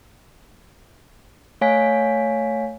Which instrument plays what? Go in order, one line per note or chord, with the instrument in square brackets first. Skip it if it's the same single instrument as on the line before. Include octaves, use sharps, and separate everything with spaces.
[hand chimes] A3 C#5 F5 G#5 B6